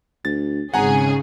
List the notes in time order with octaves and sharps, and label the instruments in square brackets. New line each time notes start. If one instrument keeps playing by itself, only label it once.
[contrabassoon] D2 [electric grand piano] A6
[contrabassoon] G#1 [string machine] G#2 C#3 [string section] C#4 G#4 [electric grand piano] F#5 G#5 A#5